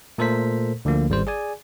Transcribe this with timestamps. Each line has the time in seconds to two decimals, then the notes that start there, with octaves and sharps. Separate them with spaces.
0.18 A#2 A3 A4 A#4 C5 B6
0.85 D2 D3 F3 A#3
1.10 G#1 G3 C5
1.27 G#4 D5 G#5